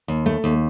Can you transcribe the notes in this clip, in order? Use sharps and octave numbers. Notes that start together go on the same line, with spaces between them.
D#2
A3
D#2